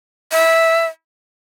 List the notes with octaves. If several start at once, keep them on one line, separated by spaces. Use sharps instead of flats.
E5